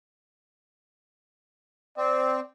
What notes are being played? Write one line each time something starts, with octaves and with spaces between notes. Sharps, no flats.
C4 D5